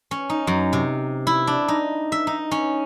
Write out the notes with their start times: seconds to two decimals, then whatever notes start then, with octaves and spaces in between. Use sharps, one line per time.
0.11 C#4
0.30 D#4
0.47 F#2
0.73 C3
1.27 E4
1.47 D4
1.68 D#4
2.12 E5
2.27 D#4
2.52 C#4